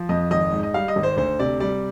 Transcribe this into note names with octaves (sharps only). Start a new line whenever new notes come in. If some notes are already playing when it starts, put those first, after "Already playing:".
Already playing: F3
F2 D#5
G#1 D#5
G#2
D#5
G3 F5
D#5
G#1
C5
D2 C5
C3 D5
G3 D5